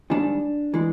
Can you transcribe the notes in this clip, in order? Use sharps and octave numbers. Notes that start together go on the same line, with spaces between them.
G#2 D#3 G3 D4
E3 G#3